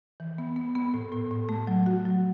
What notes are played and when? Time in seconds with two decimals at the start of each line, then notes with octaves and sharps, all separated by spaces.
0.20 E3
0.38 B3
0.56 B3
0.75 B3
0.94 A2
1.12 A2
1.31 A2
1.49 A3
1.67 F#3
1.86 F#4
2.05 F#3